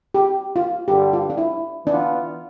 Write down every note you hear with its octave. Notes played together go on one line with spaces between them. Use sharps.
G4
F4
G2 D3 G3 G4
F4
D4
E4
E3 B3 D4 F4